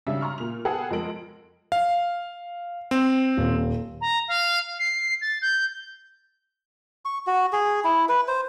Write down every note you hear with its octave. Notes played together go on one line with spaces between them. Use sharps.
G#1 C#3 G3 D4 E5
A#5 C6 C#6 F6
A#2 F7
B3 G#4 A4 B4 F#5 G5
F2 G#3 A#4 D7 F#7
F5
C4
D#1
A#5
F5
C7
A6
G6
C#6
F#4
G#4
E4
B4
C5